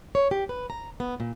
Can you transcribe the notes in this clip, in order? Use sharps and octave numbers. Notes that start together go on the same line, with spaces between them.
C#5
G4
B4
A#5
B3
A#2